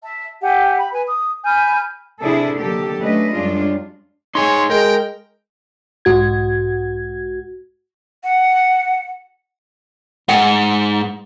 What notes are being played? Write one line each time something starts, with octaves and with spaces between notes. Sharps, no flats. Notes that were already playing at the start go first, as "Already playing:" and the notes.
E5 A5
G4 E5 F#5 G#5
B5
B4 G#5
D#6
G#5 B5 F6 G6
C3 D4 E4 G#4 A4
D#2 D3 F#3 A#3 G4 A4
F#3 A3 C#4 D4 B4 D#5
F#2 G3 G#3 D4 F4
D#4 G#4 C#5 G#5 C6
G#3 A#4 G5
B1 G#2 F#4 G#6
F#5
G#2 F#5